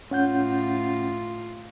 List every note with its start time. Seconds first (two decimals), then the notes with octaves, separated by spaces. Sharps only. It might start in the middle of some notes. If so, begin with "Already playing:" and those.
0.11 A2 C#4 F4 F#5 G6